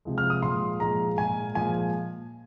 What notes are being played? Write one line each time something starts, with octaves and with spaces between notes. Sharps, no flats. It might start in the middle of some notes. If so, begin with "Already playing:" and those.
C3 F3 G#3
F6
D#6
A#2 F3 G#3 C6
A#2 F3 G#3 A#5
A#2 G#3 G#5
A#2 F3 G#3 G#5